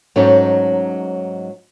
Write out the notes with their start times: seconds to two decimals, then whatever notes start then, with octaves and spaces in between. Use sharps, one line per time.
0.16 G#2 F#3 A3 C#4 D#4